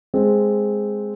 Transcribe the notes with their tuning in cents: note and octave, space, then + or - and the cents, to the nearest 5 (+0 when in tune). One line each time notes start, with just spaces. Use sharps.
G#3 +0 C4 +0